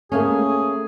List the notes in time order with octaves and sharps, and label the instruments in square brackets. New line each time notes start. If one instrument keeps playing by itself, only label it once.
[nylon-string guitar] A3 A#3 C#4 [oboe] G#4